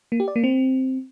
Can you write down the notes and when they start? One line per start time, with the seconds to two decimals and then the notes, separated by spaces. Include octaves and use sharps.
0.12 A#3
0.20 G4
0.28 D5
0.36 A#3
0.44 C4